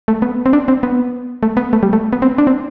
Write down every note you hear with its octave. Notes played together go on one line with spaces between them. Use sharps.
A3
B3
C4
D4
C4
B3
A3
B3
A3
G3
A3
B3
C4
D4
C4